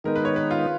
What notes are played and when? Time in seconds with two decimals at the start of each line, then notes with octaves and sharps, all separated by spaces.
0.04 D#3 G#3 B3 D#4 A#4
0.16 B4
0.25 C#5
0.36 B4
0.51 F4